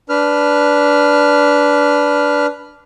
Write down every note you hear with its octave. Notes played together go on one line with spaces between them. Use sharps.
D4 B4 F6